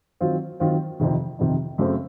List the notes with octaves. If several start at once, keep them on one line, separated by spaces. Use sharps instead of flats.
D#3 F#3 C4 F4
D#3 F#3 C4 F4
F2 C3 D#3
F2 C3 D#3
F#2 C#3 A3 C4